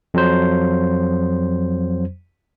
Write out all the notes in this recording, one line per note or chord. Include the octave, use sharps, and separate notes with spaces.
F2 F#3 C5